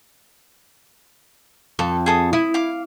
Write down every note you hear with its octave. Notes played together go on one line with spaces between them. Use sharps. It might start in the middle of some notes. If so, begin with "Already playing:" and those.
F2 A4
G#4 A4 D#6
E4 D#6
F5 D6